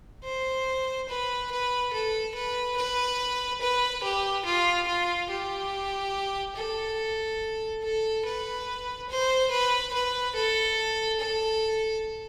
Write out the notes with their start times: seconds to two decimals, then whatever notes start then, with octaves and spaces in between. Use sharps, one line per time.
0.24 C5
1.09 B4
1.51 B4
1.93 A4
2.35 B4
2.76 B4
3.61 B4
4.03 G4
4.45 F4
4.87 F4
5.30 G4
6.56 A4
7.83 A4
8.25 B4
9.09 C5
9.51 B4
9.93 B4
10.35 A4
11.20 A4